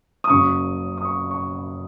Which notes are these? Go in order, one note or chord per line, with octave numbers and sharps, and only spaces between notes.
D#6
F#1 F#2 C#3 C#6
D#6
C#6
C#6